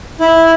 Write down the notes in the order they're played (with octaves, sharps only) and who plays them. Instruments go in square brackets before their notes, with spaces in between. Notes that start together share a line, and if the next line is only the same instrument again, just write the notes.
[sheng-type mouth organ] E4